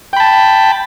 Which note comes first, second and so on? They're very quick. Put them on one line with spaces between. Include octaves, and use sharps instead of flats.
G5 B5 A5